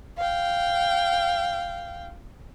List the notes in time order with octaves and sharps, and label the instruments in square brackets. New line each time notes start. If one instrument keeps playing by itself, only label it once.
[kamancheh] F5 G5